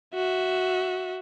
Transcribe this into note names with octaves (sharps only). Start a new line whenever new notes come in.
F#4 E5